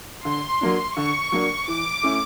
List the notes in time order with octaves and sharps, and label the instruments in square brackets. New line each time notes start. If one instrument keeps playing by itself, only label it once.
[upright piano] D3 [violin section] C6
[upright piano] F#3 A#3 D4
[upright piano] D3 [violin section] C#6
[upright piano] F#3 A#3 D4
[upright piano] E3 [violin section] D6
[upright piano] A3 C#4 E4